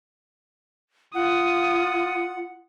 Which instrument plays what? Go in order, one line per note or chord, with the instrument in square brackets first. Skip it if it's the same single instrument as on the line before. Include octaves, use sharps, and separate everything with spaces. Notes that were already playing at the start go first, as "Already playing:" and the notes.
[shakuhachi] F4 [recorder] F#5 [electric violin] D#6